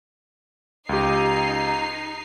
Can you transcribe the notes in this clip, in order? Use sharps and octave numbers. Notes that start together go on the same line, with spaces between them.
C#2 D#4 G4 C7